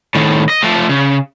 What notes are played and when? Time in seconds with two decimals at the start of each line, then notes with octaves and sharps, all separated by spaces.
0.15 A2 D#3
0.49 D#5
0.62 F3 A3
0.89 C#3